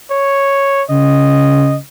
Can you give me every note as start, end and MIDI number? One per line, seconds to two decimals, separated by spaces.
0.11 0.83 73
0.90 1.77 49
0.90 1.76 75